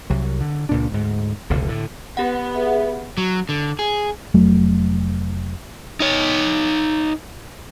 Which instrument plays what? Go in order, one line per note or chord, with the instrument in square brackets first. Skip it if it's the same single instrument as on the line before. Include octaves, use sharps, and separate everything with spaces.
[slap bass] C2 F#3
D3
C#2 A#2 D4
D2 G#2
F1 C#2 B2 D3
A2 D3
[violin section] B3 [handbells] G4 F#5
[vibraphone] G#4 E5
[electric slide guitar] F#3
D3
G#4
[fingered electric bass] F1 F#3 A3
[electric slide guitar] D#4 C#5